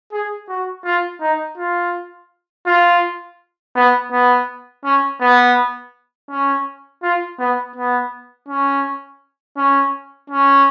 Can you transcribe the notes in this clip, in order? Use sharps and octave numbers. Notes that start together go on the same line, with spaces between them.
G#4
F#4
F4
D#4
F4
F4
B3
B3
C#4
B3
C#4
F4
B3
B3
C#4
C#4
C#4